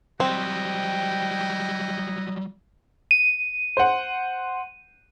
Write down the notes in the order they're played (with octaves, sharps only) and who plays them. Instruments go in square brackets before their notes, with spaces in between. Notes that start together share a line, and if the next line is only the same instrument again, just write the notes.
[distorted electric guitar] F#3 G3 [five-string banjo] C4 [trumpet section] E4 F#4 D#5 [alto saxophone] G5
[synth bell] D#7
[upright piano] C5 F#5